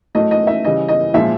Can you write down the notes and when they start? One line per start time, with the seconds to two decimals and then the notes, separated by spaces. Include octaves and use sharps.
0.15 A2 F#3 A3 D#5
0.31 D#5
0.47 E5
0.64 C#3 E3 G3 D#5
0.88 D#5
1.14 A#2 F3 G#3 E5